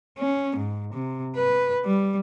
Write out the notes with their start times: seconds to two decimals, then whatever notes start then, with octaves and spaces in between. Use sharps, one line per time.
0.18 C#4
0.57 G#2
0.94 C3
1.36 B4
1.85 G3